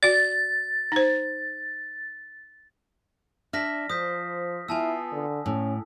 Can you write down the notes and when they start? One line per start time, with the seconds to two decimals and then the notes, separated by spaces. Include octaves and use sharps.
0.03 F#4 D5 A6
0.92 D#4 C5
3.53 D4 E5 F6 A#6 B6
3.90 F3 C5 D#6 G6 B6
4.68 B3 E4 F4 G#5 A5 E6
5.12 D3
5.46 A2 C#4